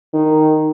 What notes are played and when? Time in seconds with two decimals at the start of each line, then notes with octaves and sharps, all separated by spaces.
0.13 D#3